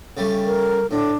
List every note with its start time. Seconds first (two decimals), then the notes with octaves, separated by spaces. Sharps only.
0.17 C#3 G3 A3
0.45 A#4
0.91 A2 D4